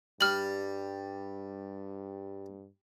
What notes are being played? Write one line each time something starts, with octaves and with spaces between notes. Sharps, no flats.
G2 G3 F6 F#7